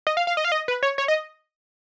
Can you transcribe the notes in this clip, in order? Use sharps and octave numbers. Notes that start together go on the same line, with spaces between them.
D#5
F5
F5
D#5
F5
D#5
B4
C#5
C#5
D#5